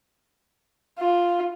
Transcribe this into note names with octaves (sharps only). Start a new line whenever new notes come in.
F4